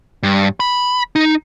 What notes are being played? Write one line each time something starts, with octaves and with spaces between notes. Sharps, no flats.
G2
B5
D#4